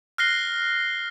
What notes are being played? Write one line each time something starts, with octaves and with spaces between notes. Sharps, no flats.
F6 F#6 A#6 C7 G7